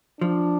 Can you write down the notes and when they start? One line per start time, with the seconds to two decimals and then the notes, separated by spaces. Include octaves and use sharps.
0.20 F3 D4